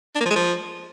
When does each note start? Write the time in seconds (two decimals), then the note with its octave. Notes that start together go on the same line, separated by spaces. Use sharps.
0.15 D4
0.20 A#3
0.26 F3
0.31 G#3
0.36 F3